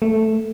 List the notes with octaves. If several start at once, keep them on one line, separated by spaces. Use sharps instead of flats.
A3